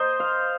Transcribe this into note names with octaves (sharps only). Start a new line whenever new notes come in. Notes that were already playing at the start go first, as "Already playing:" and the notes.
Already playing: C5 D#5
F5